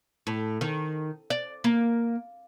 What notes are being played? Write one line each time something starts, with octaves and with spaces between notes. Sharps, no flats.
A2
D#3
D5
A#3